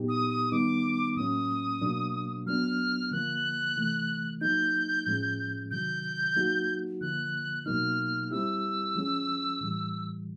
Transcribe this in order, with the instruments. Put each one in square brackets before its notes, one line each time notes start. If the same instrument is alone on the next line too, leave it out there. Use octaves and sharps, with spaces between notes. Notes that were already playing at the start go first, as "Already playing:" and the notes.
Already playing: [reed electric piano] A#2 F#3 B3 D#4 G4
[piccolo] D#6
D#6
[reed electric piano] D#3 G3 B3 D#4 [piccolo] D6
[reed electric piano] A2 F#3 A#3 C#4 [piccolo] D#6
[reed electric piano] B2 F#3 A#3 D4
[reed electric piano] F#3 B3 D4 [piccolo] F6
[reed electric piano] D3 F3 A#3 [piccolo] F#6
[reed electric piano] C3 E3 A3
[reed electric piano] F#3 A#3 D#4 [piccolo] G6
[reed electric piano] A2 F3 G#3 C#4
[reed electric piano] C3 D#3 F#3 [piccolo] G6
[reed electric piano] F#3 A#3 D#4 F#4
[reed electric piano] D3 F3 A#3 [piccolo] F#6
[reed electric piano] B2 F#3 A#3 D#4 [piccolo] F6
[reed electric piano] G3 C4 E4 G4 [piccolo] E6
[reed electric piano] F3 G#3 C#4
A2 E3 G3